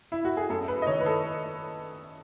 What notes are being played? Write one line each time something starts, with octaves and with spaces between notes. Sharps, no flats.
E4
F#4
G#4
F#2 A4
B4
D#5
D#3 C#5
B4
A4